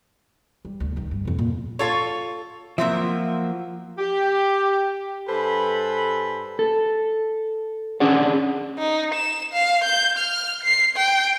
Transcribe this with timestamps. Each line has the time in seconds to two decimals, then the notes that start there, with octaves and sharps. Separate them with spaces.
0.65 G3
0.80 D2
0.96 D#3 G3
1.11 G2
1.25 F2 A2
1.39 A#2
1.79 F4 A4 C#5
2.78 F3 F#3 A#3 C4 E5
3.98 G4
5.28 G2 A4 B4 C5 G#5 B5
6.59 A4
8.00 C#4 D4 G#4 D5 F#5
8.79 D#4
9.15 E7
9.53 F5
9.84 G6
10.18 F6
10.64 C7
10.97 G5